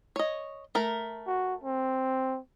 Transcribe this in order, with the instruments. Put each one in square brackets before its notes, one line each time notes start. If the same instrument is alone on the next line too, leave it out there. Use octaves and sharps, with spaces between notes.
[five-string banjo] C#5 D#5
A3 A#4 A#5
[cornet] F#4
C4